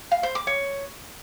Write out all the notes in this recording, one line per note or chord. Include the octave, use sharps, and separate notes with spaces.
F5
C5
D6
C#5